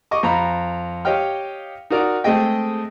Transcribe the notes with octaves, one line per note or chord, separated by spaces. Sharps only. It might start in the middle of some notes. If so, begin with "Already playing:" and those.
D#5 C#6 D6
F2 A#5 B5
G4 C#5 D#5 F5 G5 F6
D#4 F#4 A#4 D5
G#3 A3 C4 G#4 D#5 G5